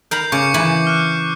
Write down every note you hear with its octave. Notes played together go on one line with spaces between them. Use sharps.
A#4 A#5 B5 G6 C7
C#3 C#6 D6 C#7
C#3 E3 B5 D6
F6 F#6